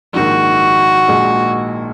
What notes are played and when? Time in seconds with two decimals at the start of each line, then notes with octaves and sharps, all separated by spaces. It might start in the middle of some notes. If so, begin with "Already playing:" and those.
0.13 A#1 G#2 D#3 F#4
1.08 A#1 A#2 G#3 D#4